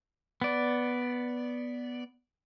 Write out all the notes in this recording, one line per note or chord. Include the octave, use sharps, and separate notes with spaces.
B3 D5